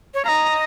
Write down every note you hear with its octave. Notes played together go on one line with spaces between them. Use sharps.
C#5
D#5 F5 A#5